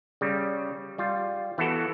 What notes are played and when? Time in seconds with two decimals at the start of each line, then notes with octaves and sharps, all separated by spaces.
0.21 C#3 G3
0.98 G3 F4
1.58 E3 B3 E4 F#4 A4